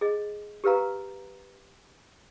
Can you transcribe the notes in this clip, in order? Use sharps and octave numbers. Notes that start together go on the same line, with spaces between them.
G#4 D#5
G4 A#4 B4 F5 A#5